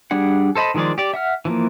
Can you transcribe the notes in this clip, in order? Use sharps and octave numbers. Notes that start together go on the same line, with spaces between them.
G3 D4 G#4 F#5
A4 C5 D#5 A5 B5
D#3 F3 G#3 G#4 D5
G4 D5
E5 F#5 F6
E3 F3 A#3